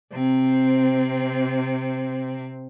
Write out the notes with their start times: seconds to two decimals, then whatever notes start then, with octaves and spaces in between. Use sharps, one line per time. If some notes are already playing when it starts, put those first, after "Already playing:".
0.12 C3 C4